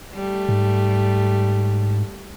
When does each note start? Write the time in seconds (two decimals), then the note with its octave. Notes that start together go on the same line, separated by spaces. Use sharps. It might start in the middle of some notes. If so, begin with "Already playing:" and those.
0.14 G3 A3
0.49 G#2